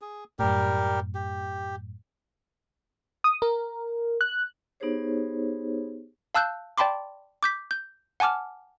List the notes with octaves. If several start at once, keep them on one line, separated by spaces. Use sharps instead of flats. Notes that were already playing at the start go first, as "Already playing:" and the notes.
G#4
F#2 A2 G3 G4 A#4
G4
D#6
A#4
F#6
B3 D#4 G4 G#4 C5 C#5
F5 A5 E6 F#6 G6
D5 G5 A5 B5 C6 D6
D6 G6 B6
G6
F#5 G#5 A5 D6 F6